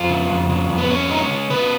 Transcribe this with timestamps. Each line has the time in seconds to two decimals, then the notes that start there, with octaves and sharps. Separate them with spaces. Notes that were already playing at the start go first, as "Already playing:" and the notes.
Already playing: F2 F4
0.09 C#3
0.30 F2
0.49 C#3
0.69 F2
0.78 B3
0.89 C#3 C#4
1.10 G#3 D#4
1.20 C#4
1.31 C#3
1.50 B3 B4